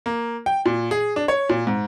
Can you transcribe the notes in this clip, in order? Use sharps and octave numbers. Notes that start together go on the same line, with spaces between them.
A#3
G5
A#2
G#4
D4
C#5
A#2
G#2